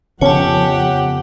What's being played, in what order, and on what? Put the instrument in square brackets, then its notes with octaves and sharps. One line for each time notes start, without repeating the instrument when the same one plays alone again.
[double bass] F2 [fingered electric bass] C#3 B3 C#4 [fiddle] G4 F#5 [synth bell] C#5 A5